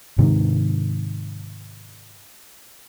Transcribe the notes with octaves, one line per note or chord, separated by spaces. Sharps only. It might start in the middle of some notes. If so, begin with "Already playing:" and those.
G#2 C3 D#3